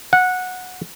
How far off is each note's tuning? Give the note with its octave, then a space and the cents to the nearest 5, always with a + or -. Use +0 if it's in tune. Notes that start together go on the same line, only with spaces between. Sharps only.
F#5 -15